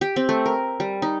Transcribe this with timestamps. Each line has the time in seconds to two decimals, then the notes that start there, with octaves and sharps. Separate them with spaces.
0.01 G4
0.16 C4
0.29 A3
0.46 A#4
0.80 G3
1.02 D#4